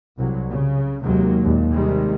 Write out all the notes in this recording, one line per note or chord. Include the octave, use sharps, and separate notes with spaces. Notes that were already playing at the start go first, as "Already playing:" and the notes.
C2 F#3
C#3
D#2 C3 F#3 G#3 A#3
D#2 A#2
C3 D#3 G3 G#3